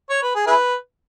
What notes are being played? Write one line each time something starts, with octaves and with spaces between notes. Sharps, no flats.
C#5
B4
G#4
E4 G#4 B4